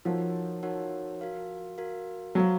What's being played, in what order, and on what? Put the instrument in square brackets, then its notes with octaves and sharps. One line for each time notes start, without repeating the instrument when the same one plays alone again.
[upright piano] F3 [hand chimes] D#4 F#4 A#4 C#5 F#5
[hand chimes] D#4 F#4 A#4 C#5 F#5
F#4 A#4 F5
F#4 A#4 F5
[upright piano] F#3 [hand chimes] F#4 C5 F5